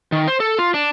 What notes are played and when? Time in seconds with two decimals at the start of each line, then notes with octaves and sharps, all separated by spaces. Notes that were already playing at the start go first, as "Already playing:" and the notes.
0.12 D#3
0.28 C5
0.40 A4
0.58 F4
0.74 D4